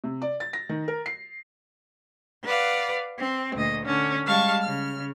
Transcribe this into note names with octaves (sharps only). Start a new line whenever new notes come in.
C3
D5
A6
A#6
D#3
A#4
C7
B4 D5 F5 F#5
C4
D2 A#2 D#5
D3 C#4
G3 G#3 F5 A5 C#6
C#3 F6